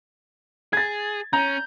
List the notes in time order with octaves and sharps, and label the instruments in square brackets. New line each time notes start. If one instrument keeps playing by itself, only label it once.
[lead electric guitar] G#4 [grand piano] G#6 A6
[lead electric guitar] C#4 [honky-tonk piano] A#5 [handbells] G6